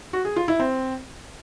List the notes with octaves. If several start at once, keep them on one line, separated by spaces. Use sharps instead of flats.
F#4
G#4
F4
E4
C4